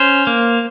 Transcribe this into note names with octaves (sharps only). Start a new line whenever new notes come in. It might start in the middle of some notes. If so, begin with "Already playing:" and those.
Already playing: C#4 C5
A#3